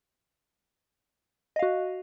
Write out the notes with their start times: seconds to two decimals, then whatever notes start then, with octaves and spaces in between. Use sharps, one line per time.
1.56 D#5
1.59 F5
1.63 F#4